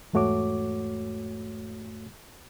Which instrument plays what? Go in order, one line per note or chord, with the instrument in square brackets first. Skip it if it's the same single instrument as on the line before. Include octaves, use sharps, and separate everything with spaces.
[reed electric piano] E2 G#2 A3 F#4 C#5 D6